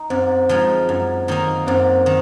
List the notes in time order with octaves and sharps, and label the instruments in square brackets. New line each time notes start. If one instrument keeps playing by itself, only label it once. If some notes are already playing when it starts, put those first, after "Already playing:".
Already playing: [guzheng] D#4
[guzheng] F#2 [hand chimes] C4 C5
[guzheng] F3 G#3 D#4
F#2
D#3 A#3 D#4 A#4
[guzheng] F#2 [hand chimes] C4 C5
[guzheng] D#3